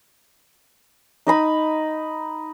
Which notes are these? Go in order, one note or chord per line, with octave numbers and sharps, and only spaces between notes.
D#4 D#5 B5